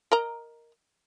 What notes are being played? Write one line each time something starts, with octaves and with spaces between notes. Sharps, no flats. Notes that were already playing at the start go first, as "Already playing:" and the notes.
A#4 D#5 A#5